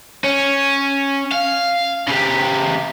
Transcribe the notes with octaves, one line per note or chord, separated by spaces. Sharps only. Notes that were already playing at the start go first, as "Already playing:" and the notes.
C#4
F5
C#3 G4